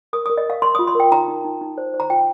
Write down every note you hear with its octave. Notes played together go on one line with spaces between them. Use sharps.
A#4 D#6
A#4 D#6
D#5
A#4 F5
A#4 C6
F4 D#6
C6
A#4 G5
D#4 A#5
D#4
D#4
D#4
C5
C5
A#5
F4 G5